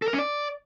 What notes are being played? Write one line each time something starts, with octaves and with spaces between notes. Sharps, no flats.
A4
A#4
C#4
D5